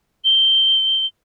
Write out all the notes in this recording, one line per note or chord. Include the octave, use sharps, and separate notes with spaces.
G7